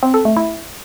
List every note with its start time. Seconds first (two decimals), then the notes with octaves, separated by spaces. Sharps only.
0.03 C4
0.14 A4
0.25 A3
0.37 E4